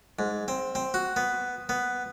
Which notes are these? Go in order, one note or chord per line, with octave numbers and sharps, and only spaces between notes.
G#2
C4
C4
F#4
B3
B3